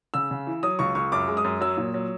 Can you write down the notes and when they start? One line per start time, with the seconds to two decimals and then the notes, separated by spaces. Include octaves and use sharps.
0.14 C#3 E6
0.31 C#3
0.47 E3
0.63 F#3 D#6
0.79 C#2 C#6
0.95 C#2 C#6
1.12 F#2 D6
1.28 G#3
1.37 D#6
1.44 F#2
1.61 F#3 E6
1.77 A#2
1.94 F#3